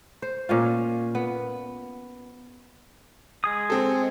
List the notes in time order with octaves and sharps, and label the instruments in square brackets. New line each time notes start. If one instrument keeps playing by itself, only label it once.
[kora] C5
A#2 C#4 F4
B3
[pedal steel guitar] G#3 G#4 D#6
[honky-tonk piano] C4 A4